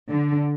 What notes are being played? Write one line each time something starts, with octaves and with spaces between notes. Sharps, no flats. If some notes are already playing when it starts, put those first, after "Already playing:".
D3